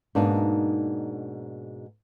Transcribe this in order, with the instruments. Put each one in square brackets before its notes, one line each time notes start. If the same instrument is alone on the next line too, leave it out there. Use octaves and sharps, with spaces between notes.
[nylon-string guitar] G#2 B2 A#3 D4 D#4